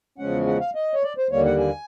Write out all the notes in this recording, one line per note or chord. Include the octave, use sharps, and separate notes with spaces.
E2 C#3 F3 G#3 C#4 F#5
F#5
F5
D#5
C#5
D5
C5
D#2 D3 G3 A#3 C#5
F#5
G#5